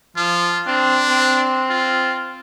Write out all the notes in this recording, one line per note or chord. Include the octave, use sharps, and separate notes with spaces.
F3 F4
C4 D4
C4
F4